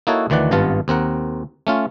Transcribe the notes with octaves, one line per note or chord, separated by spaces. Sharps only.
A#3 D#4 E4 F#4 A4 C#5
D2 D#3 E3 D5 F#5
G#1 G2 B3 F4 A5
D#2 C4 A#4 F#5
A3 C#4 F4